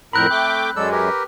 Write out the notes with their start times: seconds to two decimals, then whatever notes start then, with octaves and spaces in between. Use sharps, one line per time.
0.13 F2 A2 C4 A#4 B5 F#6 G6
0.31 A3 G5 D6
0.76 F#2 F#3 G#3 A4 D5 E6
0.92 G4 A#4 B4